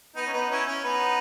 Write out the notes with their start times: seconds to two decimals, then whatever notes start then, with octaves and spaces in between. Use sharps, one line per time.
0.16 B3 D#4
0.27 C#4
0.33 B3 D#4
0.50 C#4 E4
0.67 C#4
0.84 B3 D#4